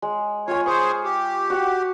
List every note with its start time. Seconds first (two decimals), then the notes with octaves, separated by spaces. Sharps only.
0.02 G#3
0.48 F4 C#5 G#5
0.66 G#4 C5 C#6
1.04 G4
1.50 F#4 F#5